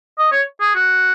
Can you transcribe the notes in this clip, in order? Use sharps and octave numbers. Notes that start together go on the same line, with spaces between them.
D#5
C#5
G#4
F#4